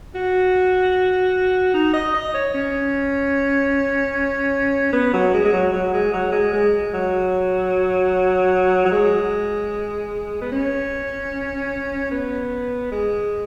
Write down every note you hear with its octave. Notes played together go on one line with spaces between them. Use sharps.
F#4
D#4
D#5
D#5
C#5
C#4
B3
F#3
G#3
G#3
F#3
F#3
G#3
F#3
G#3
G#3
F#3
F#3
G#3
B3
C#4
B3
G#3